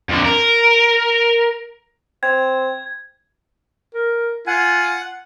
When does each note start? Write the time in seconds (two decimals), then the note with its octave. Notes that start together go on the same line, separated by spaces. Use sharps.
0.09 F2 D3
0.26 A#4
2.23 C4 G#6
3.95 A#4
4.47 F4 F#5 G#5